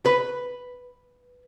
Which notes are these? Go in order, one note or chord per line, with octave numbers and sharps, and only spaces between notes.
B4